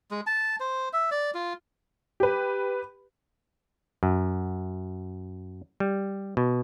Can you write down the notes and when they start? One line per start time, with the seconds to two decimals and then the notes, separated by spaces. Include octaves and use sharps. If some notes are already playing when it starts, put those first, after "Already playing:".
0.11 G#3
0.26 A5
0.60 C5
0.93 E5
1.11 D5
1.34 F4
2.20 G4 B4
4.03 F#2
5.80 G3
6.37 B2